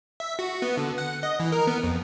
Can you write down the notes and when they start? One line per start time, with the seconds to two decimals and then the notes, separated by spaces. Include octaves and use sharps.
0.20 E5
0.39 F#4
0.62 B3
0.77 D3
0.98 F#5
1.23 D#5
1.40 E3
1.52 A#4
1.67 B3
1.83 F2